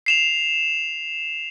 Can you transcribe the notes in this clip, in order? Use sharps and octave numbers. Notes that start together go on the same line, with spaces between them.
C7 E7 F7